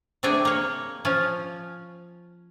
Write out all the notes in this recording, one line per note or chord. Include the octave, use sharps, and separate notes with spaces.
C3 A3 D4 G#4 G5
A#3 C#5
F3 C#4 F4